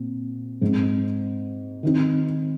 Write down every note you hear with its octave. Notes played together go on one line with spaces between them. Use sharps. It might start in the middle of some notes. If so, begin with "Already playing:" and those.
Already playing: A#2 C4
G#2 G#3 C4
D#3 C4 D#4